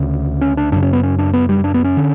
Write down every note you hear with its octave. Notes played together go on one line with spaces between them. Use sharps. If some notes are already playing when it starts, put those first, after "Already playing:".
Already playing: D2 C#3
C#4
D4
F#2 C#3 D4
C#4
B3
C#4
D4
B3
G3
D4
B3
C#4
D3